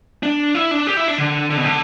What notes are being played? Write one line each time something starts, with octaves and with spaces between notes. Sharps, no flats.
D4
E4
D4
G4
E4
D4
D3
D3
B2
D3